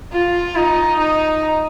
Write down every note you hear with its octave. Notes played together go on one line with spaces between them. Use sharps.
F4
D#4
D#4